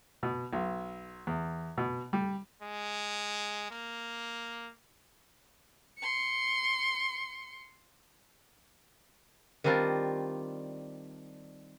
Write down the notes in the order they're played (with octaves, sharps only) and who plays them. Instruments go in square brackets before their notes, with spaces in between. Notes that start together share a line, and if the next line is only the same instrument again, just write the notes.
[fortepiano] B2
B1
E2
B2
G3
[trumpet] G#3
A#3
[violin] C6 C#7
[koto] D#3 G3 C4 D4 F4